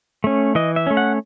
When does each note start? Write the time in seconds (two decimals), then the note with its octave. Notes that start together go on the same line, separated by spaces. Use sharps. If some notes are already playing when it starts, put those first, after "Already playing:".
0.24 A3 C#4
0.55 E3 D#5
0.76 E5
0.87 A3 C#4
0.97 F#5